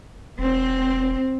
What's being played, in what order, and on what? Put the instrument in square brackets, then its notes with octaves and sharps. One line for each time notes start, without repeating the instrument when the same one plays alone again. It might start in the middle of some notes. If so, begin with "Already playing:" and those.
[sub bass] E1 [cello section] C4